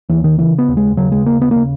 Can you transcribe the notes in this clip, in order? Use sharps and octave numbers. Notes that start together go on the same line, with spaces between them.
D#2 E3
D#3
C#3 E3
B3
D#2
G#3
C#3 F#3
G#3
D#2 A#3
B3
C#3 A#3